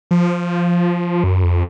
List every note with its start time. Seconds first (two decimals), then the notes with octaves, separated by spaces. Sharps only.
0.11 F3
1.24 F#2
1.43 F2